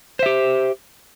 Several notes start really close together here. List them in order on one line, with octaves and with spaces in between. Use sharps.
C5 E5 G4